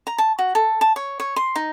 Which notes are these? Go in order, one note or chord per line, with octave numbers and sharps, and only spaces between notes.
A#5
A5
F#4
A4
A5
C#5
C#5
C6
D#4